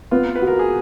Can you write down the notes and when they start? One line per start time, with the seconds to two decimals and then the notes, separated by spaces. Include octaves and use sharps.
0.11 B3 F4
0.36 B4
0.42 F#4
0.47 A#4
0.59 G#4